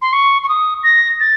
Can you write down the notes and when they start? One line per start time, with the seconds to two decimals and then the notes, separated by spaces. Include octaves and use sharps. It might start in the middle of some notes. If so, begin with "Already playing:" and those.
0.01 C6
0.13 C#6
0.43 C#6
0.48 D#6
0.83 A#6
1.20 A6